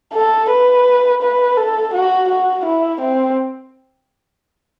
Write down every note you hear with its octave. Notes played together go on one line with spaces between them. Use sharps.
A4
B4
B4
A4
F#4
F#4
E4
C4